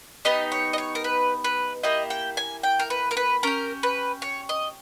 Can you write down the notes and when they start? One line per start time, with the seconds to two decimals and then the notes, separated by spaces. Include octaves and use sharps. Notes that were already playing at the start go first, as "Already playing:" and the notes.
0.25 B3 D#4 G4 D#5
0.52 C#5
0.73 D#5
0.78 C#5
0.95 A#4
1.04 B4
1.44 B4
1.83 A#3 E4 G4 D#5
2.10 G5
2.37 G#5
2.63 G5
2.79 A#4
2.90 B4
3.11 A#4
3.17 B4
3.43 C#4 G4 A#4
3.83 B4
4.22 C#5
4.49 D#5